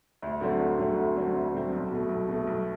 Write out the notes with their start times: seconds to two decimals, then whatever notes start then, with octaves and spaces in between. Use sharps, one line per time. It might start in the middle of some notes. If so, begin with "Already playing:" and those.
0.22 D2
0.41 D3 F#3 A3 C4
0.59 D2
0.78 D3 F#3 A3 C4
0.97 D2
1.16 D3 F#3 A3 C4
1.35 D2
1.53 D3 F#3 A3 C4
1.73 B1
1.91 B2 A3
2.09 B1
2.28 B2 A3
2.47 B1